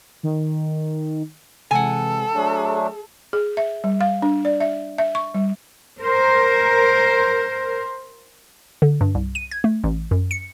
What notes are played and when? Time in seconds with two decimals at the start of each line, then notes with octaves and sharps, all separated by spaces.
0.23 D#3
1.71 C3 E3 G#3 A4 F#5 G#5
2.34 F#3 A3 D4 G#4
3.33 G#4
3.57 E5
3.84 G3
4.01 F5
4.22 D4
4.45 D5
4.60 E5
4.98 E5
5.15 C#6
5.34 G3
6.03 A#4 C5
8.82 D3
9.01 G2
9.15 C2
9.35 D#7
9.51 G#6
9.64 A3
9.84 A1
10.11 F#2
10.31 C#7